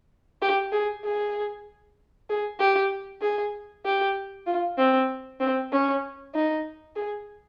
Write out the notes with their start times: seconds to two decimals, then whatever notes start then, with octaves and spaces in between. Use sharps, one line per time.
0.42 G4
0.72 G#4
1.05 G#4
2.30 G#4
2.60 G4
3.22 G#4
3.85 G4
4.47 F4
4.78 C4
5.40 C4
5.72 C#4
6.35 D#4
6.96 G#4